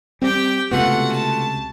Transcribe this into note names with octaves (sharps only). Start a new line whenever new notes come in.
G3 C4 G4 G5
C#2 C3 A3 B3 F4 F#4 F#5
A5